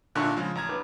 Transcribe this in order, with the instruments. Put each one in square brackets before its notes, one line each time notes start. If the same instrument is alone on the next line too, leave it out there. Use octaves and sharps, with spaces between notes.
[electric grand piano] A#2 D3 D4 [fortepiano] E5 C#6 F#6
[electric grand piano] C#3 F3 G#3
A1 A#5 G#6
[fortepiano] B4 D6